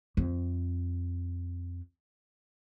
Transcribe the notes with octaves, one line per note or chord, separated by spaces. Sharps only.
F2 C4